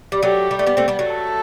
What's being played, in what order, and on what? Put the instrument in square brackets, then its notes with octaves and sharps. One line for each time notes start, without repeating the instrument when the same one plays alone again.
[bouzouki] G3
[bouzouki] F#3 A3 [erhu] G4
[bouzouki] G3
A3
G3 B3
A3 C4
G3 B3
F#3 A3
[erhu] A4